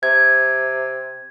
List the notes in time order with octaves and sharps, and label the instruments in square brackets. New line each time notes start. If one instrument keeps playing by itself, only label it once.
[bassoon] C3 [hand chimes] G#6